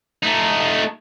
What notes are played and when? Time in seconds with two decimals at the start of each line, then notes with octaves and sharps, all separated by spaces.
0.23 A3 D#4